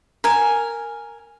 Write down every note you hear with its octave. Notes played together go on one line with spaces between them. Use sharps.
A#4 G#5